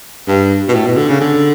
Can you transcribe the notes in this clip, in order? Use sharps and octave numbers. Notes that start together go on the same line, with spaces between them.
G2
B2
A2
B2
D3
C#3
D3